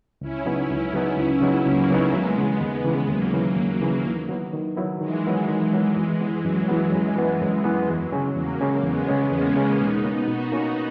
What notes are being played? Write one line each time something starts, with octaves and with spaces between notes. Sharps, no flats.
C#2 C#4 E4
C#3 F#3 B3 D#4
C#2
C#3 F#3 B3 D#4
C#2 C#4 E4
C#3 F#3 B3 D#4
C#2 F#3 A#3
C#3 F#3 B3 D#4
D#2 G#3 B3
C#3 E3
D#2 G#3 B3
C#3 E3
D#2 F#3 A#3
C#3 E3
D#2
C#3 E3
D#3
F#3 B3 E4
D#3
F#3 B3 E4
D#3 E3 G#3
F#3 B3 E4
D#3 E3 G#3
F#3 B3 E4
F#2 E3 G#3
E3 B3
F#2 F#3
E3 B3
F#2 E3 G#3
E3 B3
F#2 E3
E3 B3
E2 F#3
C#3 G#3 C#4
E2 F#3 A#3
C#3 G#3 C#4
E2 G#3 B3
C#3 G#3 C#4
E2 A#3 C#4
C#3 G#3 C#4
B2 B3 D#4
A#3 C#4 F#4
B2 D#4 F#4
A#3 C#4 F#4